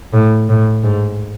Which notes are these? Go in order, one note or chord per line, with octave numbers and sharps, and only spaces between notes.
A2
A2
G#2